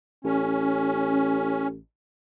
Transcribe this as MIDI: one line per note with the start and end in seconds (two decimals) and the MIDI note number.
0.25 1.80 33
0.25 1.68 61